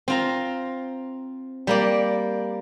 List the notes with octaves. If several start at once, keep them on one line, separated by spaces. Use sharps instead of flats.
C4 F4 A#5
G3 A#3 D5